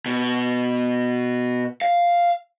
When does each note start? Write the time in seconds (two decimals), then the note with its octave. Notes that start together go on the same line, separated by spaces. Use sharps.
0.06 B2
1.82 F5